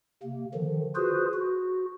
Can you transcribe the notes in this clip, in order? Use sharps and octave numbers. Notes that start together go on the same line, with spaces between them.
C3 A#3
D3 D#3 F3
F4 F#4 G#4 B4 C5
F#4